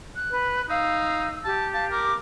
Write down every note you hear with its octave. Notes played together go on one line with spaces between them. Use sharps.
F#6
B4
D#4 F5 E6
G4 A5
F5 A5
A#4 D6